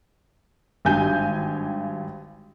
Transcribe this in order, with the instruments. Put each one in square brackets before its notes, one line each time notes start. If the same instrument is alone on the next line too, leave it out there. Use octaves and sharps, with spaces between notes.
[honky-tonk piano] G#1 G2 G4 G#5 G6